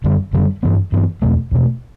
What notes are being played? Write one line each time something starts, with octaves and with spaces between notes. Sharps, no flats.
F#2 D3 G3
F#2 D3 G3
G2 E3 B3
G2 E3 B3
E2 B2 A3
E2 B2 A3